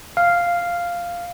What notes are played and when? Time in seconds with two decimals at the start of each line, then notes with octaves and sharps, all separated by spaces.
0.17 F5